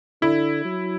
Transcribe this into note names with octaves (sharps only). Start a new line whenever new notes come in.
D3 E4
F#3